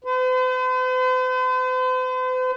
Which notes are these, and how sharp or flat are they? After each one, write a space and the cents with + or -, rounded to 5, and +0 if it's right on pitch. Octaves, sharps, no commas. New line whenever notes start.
C5 -45